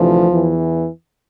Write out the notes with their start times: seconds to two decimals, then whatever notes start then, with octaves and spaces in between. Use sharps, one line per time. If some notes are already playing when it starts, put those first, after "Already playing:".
Already playing: D2 C3 E3 F3
0.29 E2 E3